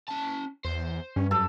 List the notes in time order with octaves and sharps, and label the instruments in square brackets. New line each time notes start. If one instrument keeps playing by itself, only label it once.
[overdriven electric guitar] C#4 A5
[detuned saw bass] E2 [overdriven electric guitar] C5
[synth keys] G2 [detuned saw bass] C#4
[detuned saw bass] F#2 [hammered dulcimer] A4